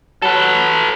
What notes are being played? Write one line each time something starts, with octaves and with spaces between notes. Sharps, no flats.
F#3 A4 B4